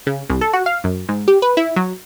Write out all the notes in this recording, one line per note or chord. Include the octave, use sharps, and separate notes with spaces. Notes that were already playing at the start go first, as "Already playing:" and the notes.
C#3
C2
A4
F#4
F5
F#2
G#2
G4
B4
E4
F#3